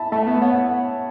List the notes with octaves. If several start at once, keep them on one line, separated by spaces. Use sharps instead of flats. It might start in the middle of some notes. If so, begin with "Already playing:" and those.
Already playing: E5 A5 B5
A3 E5 A5
B3
B3 C#5 F#5